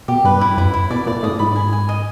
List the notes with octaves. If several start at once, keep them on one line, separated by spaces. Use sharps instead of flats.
B2 G4
G2 B4
E4
F#2 E4
E4
B2 D5
A#2 D5
A2 D#6
G#2 B5
G#5
G#5
D#5